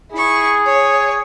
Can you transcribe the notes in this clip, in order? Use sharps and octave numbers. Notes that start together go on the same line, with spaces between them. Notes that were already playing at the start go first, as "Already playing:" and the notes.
E4 G#4 C#6
C#5